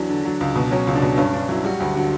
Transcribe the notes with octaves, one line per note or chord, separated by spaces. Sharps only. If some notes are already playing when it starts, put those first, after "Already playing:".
Already playing: E2 F#3 D4
D3
F#3
C#2
B2
F#3 C#4
C#2
D4
B2
G2 C#4
G2 D4
F#3 E4
G3 F#4
D2 F#4
D3 F#4